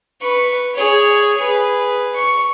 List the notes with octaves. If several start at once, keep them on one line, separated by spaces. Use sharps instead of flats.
B4 C#6
G#4 C#5
G#4 B4
C#6